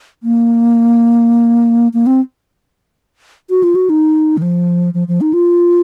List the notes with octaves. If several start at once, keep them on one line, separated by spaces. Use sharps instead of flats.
A#3
A#3
C4
F#4
F4
F#4
D#4
D#3
F3
F3
F3
D#4
F4